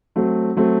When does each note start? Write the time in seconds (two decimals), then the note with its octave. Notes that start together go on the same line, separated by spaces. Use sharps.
0.16 F#3 A3 C4
0.57 F#3 A3 C4